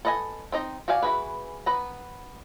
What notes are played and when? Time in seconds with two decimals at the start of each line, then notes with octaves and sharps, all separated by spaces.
0.05 A4 B4 D#5 F5 G#5
0.52 C4 D#4 D#5
0.88 F#4 G4 D5 F5 G#5
1.02 E3 F3 F#4 G#4 B4
1.66 B3 B4 A#5